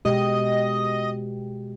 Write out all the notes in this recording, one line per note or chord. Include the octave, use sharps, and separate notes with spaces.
B2 G#3 G4 D#5